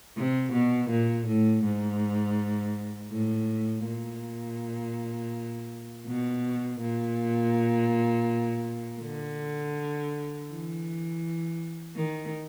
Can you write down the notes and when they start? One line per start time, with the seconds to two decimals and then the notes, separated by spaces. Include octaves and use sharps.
0.17 C3
0.53 B2
0.90 A#2
1.27 A2
1.64 G#2
3.11 A2
3.85 A#2
6.06 B2
6.80 A#2
9.01 D3
10.49 E3
11.96 D#3